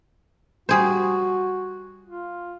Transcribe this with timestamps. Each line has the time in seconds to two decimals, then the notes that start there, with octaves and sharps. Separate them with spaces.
0.69 G3 F#4 G#4 C5
2.05 F4